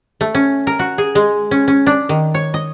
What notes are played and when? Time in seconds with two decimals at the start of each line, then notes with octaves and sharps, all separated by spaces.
0.21 A3
0.35 C#4
0.67 A#4
0.79 F#4
0.98 G#4
1.15 G#3
1.51 C#4
1.68 C#4
1.87 D4
2.09 D#3
2.34 C#5
2.54 D#5